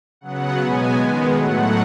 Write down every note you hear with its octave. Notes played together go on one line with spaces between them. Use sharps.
C#3 F#3 B3 F#5
B2 G#3 B3 G#5
D#3 G#3 B3
A2 F#3 A3 F#5